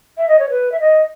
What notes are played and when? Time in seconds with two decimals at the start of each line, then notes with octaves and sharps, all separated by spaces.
0.17 E5
0.28 D#5
0.39 C#5
0.50 B4
0.72 E5
0.80 D#5